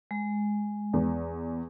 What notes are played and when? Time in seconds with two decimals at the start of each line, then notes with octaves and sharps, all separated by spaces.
0.11 G#3
0.93 E2